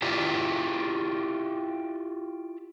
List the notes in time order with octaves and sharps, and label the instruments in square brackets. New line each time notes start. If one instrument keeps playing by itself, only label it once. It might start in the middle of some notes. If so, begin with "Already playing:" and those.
[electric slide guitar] E4 F4 G4 D5